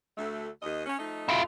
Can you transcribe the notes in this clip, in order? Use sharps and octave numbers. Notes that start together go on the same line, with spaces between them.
D2 A3
D#2 D#5
C#4
F3 A3 D#4
E4 F4